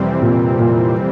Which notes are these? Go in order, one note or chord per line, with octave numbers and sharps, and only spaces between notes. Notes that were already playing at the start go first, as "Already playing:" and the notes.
Already playing: F2 C3 E3 G3 C4
A#2
A#2